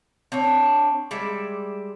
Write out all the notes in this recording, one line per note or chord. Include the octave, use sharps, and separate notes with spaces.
C4 D4 C#5
G3 G#3 D5 E5